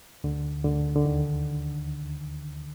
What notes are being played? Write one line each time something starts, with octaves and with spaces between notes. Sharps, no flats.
D2 D3
D2 D3
D3
D#2 D#3